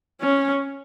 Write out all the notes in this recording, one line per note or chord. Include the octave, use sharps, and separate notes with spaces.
C#4